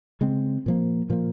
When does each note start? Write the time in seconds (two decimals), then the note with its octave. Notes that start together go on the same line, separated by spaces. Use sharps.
0.21 C#3 G#3 C4
0.66 A#2 F3 A#3
1.10 A#2 F3 A#3